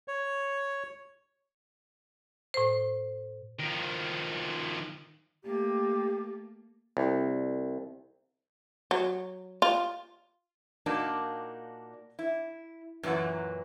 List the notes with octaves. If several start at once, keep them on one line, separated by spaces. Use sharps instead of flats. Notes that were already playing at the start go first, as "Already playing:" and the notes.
C#5
A2 C5
D#3 F3
A3 A#3 G4
C2
F#3
F4
A#2 A#3 D4 D#4 F#4
E4
F#2 A#2 E3 F#3 F#5